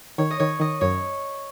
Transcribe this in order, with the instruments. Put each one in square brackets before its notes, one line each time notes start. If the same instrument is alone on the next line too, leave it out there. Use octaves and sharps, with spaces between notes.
[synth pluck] D#3 [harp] C#5
[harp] D#5
[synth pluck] D#3 [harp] C#5
[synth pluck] D#3 [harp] D#5
[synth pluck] F#2 [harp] C#5